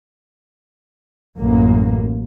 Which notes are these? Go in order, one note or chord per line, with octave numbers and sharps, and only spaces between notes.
A1 F#2 A#3